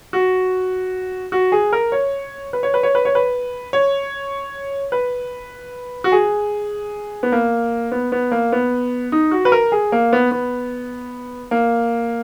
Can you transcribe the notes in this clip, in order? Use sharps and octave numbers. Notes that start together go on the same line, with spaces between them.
F#4
F#4
G#4
A#4
C#5
B4
C#5
B4
C#5
B4
C#5
B4
C#5
B4
F#4
G#4
B3
A#3
B3
B3
A#3
B3
D#4
F#4
B4
A#4
G#4
A#3
B3
B3
A#3